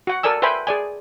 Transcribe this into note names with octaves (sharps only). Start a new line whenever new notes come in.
F#4 F#5
A4 A#4 D5 G#5 E6
B4 C5 E5 G5 G#5 B5
G#4 D5 G#5